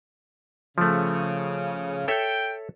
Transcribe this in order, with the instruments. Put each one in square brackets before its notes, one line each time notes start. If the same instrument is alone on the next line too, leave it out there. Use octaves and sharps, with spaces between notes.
[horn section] C#3 [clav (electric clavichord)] F3 A3
[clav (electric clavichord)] A4 C#5 E5 [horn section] G5